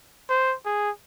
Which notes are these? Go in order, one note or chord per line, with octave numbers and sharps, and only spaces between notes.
C5
G#4